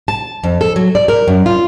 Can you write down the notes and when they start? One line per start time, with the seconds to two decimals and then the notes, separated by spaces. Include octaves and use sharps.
0.08 A5
0.43 F2
0.61 A4
0.76 F#3
0.95 D5
1.08 A#4
1.28 F#2
1.46 F4